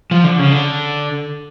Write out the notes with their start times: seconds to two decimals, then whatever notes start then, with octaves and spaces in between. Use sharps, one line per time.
0.11 F3
0.24 D3
0.38 C#3
0.51 D3